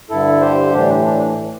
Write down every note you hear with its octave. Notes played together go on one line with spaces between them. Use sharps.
G2 D3 E4 A4
G4 C5
A2 E3 D4 G4
D4